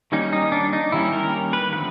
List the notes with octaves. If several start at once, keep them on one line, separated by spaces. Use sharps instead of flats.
D#3 G3 A#3 C#4 D#4
D#4
D4
D#4
D#3 G3 A#3 C#4 E4
A#4
B4
D3 F3 A3 C4 B4